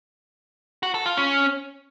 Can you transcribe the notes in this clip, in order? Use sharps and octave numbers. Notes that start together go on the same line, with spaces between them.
F#4
A4
F4
C#4